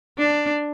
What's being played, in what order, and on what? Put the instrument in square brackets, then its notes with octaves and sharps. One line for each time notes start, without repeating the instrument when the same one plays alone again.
[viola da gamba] D4